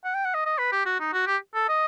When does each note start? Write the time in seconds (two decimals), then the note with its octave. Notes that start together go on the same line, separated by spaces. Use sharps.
0.05 F#5
0.14 G5
0.25 F#5
0.35 D#5
0.46 D#5
0.59 B4
0.72 G4
0.86 F#4
1.00 D#4
1.14 F#4
1.27 G4
1.55 A4
1.69 D#5